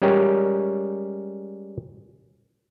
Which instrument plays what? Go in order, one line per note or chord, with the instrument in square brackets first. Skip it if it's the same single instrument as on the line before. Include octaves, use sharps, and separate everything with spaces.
[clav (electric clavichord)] G3 G#3 C#4 G4 A#4 C#5